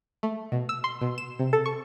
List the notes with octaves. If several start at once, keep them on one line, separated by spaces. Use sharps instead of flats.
A3
B2
E6
C6
B2
E7
C3
A4
C#6